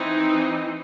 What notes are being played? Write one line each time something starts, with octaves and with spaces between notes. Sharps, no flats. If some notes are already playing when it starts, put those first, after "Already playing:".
Already playing: E3 C4 D#4